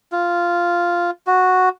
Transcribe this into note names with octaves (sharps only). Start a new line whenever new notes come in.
F4
F#4